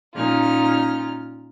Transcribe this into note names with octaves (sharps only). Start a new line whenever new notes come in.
A#2 C#4 D#4 F4 F6